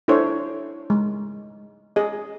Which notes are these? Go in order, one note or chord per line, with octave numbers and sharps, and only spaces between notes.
D4 E4 A4 C5 C#5
G#3
G#4 D#5